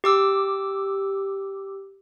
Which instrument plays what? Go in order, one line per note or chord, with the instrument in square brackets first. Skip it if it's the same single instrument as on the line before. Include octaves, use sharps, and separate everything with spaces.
[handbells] G4 D6 E6